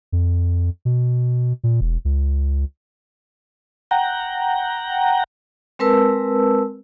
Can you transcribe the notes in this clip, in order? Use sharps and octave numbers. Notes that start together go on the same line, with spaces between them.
F2
B2
A#2
E1
C#2
F#5 G5 A#5
G#3 C4 A#4 B4 A5 E6